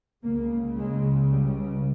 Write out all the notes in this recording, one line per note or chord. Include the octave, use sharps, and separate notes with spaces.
C#2 C#3 A#3
G#3
G3